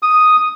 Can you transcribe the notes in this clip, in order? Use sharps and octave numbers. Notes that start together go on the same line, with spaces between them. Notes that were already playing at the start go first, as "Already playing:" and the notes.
D#6